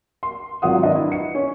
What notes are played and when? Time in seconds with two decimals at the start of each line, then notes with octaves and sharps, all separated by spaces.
0.23 C6
0.62 G#1 F#3 F4 F#5 D#6
0.83 D4 A#4 B4 D#5
0.95 E4
1.12 C#7
1.35 C#4